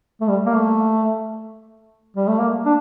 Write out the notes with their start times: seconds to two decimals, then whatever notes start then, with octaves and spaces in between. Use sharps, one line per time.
0.21 A3
0.28 G3
0.46 A#3
0.55 A3
2.17 G3
2.28 A3
2.39 A#3
2.66 D4